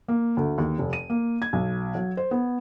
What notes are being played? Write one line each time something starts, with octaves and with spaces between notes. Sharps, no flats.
A#3
D2
D#2
F1
D#7
A#3
G#6
B1
F#3
C5
B3